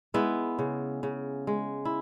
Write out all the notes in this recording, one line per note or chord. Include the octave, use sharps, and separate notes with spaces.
G#3 B3 E4
C#3
C#3
G#3
E4